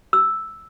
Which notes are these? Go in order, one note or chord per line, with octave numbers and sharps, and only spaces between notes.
E6